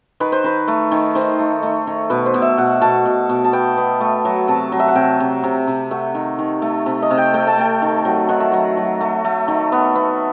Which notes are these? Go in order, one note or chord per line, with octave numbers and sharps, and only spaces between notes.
D#3 B4
C5
D#3 B4
A3
D#3
D#3 C5
A3
A3
D#3
B2 B4
C5
B2
E5
B2 F#5
B2 A5
B2
B2
A5
B3 G5
B3
A3
F#3
C3 A5
F#3
E5
F#5
C3 G5
C3
C3
C3
A3 F#5
D#3
D#3
A3
C3
D#5
C3
G5
A3 G5
A5
A3 G5
D#3
F#3
D#3 F#5
E5
F#3 F#5
F#3
A3
A3
D#3
B3
B3